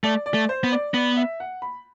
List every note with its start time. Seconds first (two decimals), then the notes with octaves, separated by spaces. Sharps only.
0.04 A3 D5
0.26 D5
0.34 A3
0.49 C5
0.64 B3
0.72 D5
0.94 B3 D5
1.17 E5
1.40 F#5
1.62 B5